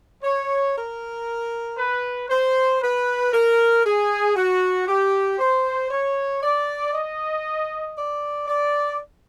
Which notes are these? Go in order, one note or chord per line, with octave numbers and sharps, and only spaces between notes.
C#5
A#4
B4
C5
B4
A#4
G#4
F#4
G4
C5
C#5
D5
D#5
D5
D5